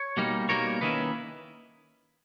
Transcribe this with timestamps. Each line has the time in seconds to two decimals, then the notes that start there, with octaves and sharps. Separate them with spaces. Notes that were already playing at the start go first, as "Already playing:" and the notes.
Already playing: C#5
0.17 B2 G3 A#3 D#4
0.49 B2 G3 A#3 D#4 A#4 C#5
0.81 D#3 A#3 C#4 E4 B4 D#5